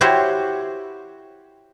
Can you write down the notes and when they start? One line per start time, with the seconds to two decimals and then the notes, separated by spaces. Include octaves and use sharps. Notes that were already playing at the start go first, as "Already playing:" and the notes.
0.01 E4 F#4 G4 C5 C#5